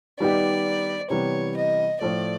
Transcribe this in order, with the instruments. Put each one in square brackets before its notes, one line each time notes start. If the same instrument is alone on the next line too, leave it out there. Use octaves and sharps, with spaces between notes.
[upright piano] D#3 G3 B3 D#4 G4 [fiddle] D5
[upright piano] C3 E3 G3 B3 [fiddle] C#5
[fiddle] D#5
[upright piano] A2 F3 A3 [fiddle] D5